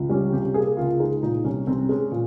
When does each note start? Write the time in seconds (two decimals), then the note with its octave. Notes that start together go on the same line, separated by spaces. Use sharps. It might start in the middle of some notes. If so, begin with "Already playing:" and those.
Already playing: C#2
0.09 G3 C#4
0.33 C3 G4
0.54 A#3 G#4
0.77 C#2 F4
0.99 G#3 D#4
1.23 A#2 D#4
1.44 C2 C#4
1.67 C2 C4
1.89 G#3 C#4
2.12 A#2